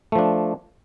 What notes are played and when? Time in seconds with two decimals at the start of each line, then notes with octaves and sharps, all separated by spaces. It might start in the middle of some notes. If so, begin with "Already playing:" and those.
0.12 A3
0.15 F3
0.19 D4